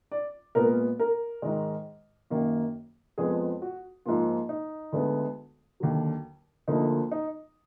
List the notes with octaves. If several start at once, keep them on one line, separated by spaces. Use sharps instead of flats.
D5
A#2 G#3 B3 A#4
A#4
G#2 D#3 G#3
F#2 D#3 A#3
F2 F3 G#3 B3 G#4
F#4
G#2 F3 A#3 F4
D#4
D2 D3 G#3 B3
D#2 D3 F#3
D2 D3 F3 A#3 D#4
D#4